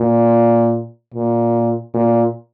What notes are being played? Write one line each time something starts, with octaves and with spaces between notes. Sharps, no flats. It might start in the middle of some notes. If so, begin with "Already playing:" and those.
Already playing: A#2
A#2
A#2